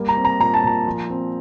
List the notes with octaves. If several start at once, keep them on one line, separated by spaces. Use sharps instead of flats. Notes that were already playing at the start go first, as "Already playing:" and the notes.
Already playing: G3 A#3
A#5
C4
A#5
A#2 A#5
A5
A#2 A#5
F3
C4